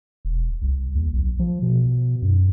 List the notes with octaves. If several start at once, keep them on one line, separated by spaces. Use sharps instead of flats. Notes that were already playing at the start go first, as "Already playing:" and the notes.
E1
C2
D#2
B1
F3
B2
F#2